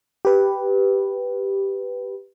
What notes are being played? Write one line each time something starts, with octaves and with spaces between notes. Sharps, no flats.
G4 B4